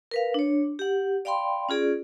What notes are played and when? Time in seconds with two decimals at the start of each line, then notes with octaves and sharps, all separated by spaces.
0.11 A#4 B4 F5
0.34 D4 C#5
0.79 G4 F#5
1.25 D5 F5 G5 B5 C6
1.69 C#4 F4 G#4 D5